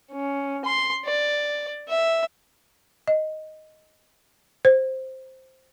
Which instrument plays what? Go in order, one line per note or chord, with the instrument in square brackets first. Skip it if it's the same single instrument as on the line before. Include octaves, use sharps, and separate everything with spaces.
[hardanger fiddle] C#4
C6
D5
E5
[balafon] D#5
C5